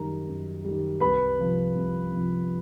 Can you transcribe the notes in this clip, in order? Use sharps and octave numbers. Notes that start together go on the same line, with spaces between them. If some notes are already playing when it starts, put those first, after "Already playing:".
Already playing: F#2 D#3 G3 A#4 A#5
F#2
D#3 G3
C2 B4 B5
C3 F3
C2
C3 F3